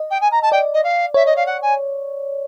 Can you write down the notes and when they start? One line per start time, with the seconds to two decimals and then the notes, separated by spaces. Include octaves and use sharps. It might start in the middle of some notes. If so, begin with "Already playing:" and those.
Already playing: D#5
0.10 G5
0.21 G#5
0.31 A#5
0.42 A5
0.52 D5 G5
0.73 D#5
0.83 F5
1.14 C#5 E5
1.26 D#5
1.36 F5
1.46 F#5
1.62 G#5